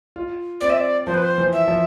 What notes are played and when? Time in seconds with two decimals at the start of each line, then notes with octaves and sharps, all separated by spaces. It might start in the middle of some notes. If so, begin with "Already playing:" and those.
0.16 F4
0.61 C4 D5
0.70 E5
0.77 D5
1.07 F3 C5
1.14 B4
1.22 C5
1.38 E3
1.53 E5
1.68 F3